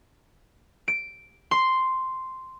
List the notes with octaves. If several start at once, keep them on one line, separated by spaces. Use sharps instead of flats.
D7
C6